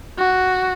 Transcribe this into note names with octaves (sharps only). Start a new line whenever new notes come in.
F#4